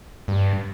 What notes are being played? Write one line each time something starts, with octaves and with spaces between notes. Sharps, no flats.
G2